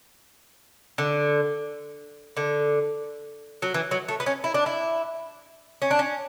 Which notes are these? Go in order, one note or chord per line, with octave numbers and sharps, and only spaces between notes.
D3
D3
F#3
E3
F#3
A3
B3
C#4
E4
D4
E4
C#4
D4
C#4